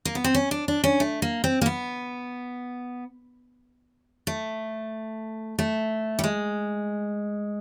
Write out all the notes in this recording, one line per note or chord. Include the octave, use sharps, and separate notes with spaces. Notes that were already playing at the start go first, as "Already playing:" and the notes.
A#3
B3
C4
C#4
D4
D4
C#4
A3
A#3
C4
A#3
B3
A3
A3
G3
G#3